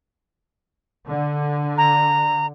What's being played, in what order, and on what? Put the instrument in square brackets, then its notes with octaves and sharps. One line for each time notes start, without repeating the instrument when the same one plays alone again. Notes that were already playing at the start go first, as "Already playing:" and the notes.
[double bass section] D3
[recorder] A#5